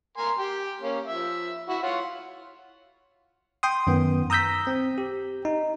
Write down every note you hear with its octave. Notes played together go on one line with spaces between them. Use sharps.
A#4 G#5 C6
G4 G5
A#3 C#4
F3 E5
E4 F#4 E5
F4 C#5 F#5
G5 C6 D#6
F#2 D#3 B3
A#5 D#6 E6 G6 A#6 B6
C4
G4
D#4